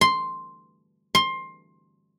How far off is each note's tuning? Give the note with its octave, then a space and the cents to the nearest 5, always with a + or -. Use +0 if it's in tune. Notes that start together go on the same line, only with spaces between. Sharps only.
C6 +0
C6 +20